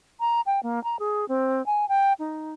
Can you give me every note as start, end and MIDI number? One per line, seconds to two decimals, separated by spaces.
0.20 0.41 82
0.46 0.60 79
0.63 0.82 58
0.84 0.99 82
0.99 1.28 68
1.28 1.64 60
1.66 1.88 80
1.89 2.13 79
2.19 2.54 63